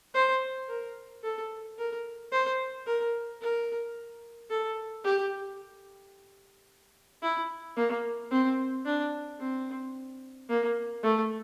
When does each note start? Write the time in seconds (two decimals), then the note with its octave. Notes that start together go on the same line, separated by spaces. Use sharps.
0.14 C5
0.68 A#4
1.23 A4
1.78 A#4
2.32 C5
2.86 A#4
3.41 A#4
4.50 A4
5.04 G4
7.22 E4
7.77 A#3
8.31 C4
8.86 D4
9.40 C4
10.49 A#3
11.03 A3